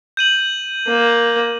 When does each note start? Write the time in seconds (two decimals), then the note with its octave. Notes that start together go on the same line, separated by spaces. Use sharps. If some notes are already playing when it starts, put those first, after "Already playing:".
0.17 G6 D#7 F#7
0.87 A#3